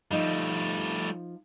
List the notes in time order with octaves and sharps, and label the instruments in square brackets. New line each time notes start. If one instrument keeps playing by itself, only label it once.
[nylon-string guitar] F3 D#4 D#5 [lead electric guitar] G3 A3